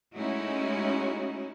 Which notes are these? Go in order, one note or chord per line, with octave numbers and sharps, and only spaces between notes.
G#3 A3 C#4 D#4 E4 F#4